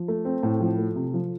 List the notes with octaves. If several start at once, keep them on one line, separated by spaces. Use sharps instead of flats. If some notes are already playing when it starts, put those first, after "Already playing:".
Already playing: F3
A3
C4
A2
F3
A3
C3
F3